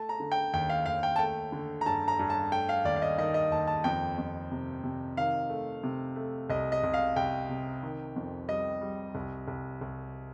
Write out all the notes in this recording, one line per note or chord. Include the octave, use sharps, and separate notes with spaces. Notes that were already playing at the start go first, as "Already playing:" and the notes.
Already playing: A3 A5
A#5
D3
G5
D#2 G5
F5
D#2 F5
G5
A5
A3 G5
D3
A#5
G2 A5
A#5
G2
A5
A3 G5
F5
D#2 D5
F5
D#5
D#3 D#5
D#5
D#2 A5
A5
F2 G5
F2
C3
C3
D#3 F5
A3
C3
A3
C2 D#5
D#5
C2
F5
C2 G5
C3
D#3
F2
G3 D#5
G3
C2
C2
C2